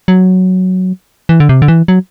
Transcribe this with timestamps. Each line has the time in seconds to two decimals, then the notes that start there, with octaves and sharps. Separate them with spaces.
0.08 F#3
1.29 E3
1.40 D3
1.49 C3
1.62 D3
1.68 E3
1.88 F#3